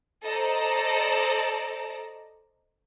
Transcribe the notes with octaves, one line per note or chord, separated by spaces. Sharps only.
A4 C5 D5 D#5 A5 A#5